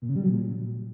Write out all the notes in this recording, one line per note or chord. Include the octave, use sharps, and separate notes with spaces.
A#2
C#3
G3
F#3
A#2